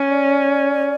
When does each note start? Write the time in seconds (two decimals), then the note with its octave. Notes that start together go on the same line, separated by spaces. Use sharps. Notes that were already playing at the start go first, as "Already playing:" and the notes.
Already playing: C#4
0.09 D5